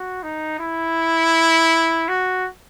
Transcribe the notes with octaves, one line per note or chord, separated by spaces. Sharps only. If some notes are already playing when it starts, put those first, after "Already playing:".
Already playing: F#4
D#4
E4
F#4